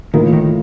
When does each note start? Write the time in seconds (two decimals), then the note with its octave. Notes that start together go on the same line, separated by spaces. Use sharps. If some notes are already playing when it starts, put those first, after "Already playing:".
0.13 A2 D#3 F3 A#3 F4 A#4
0.33 D#3